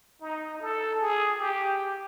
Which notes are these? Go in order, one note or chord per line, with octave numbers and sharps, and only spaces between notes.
D#4
A4
G#4
G4